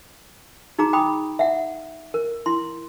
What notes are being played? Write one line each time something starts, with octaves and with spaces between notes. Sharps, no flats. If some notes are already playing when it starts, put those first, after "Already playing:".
D#4 F#4 G#4 A#5 D6
G5 B5 D6 D#6
E5 F#5
A#4
E4 C6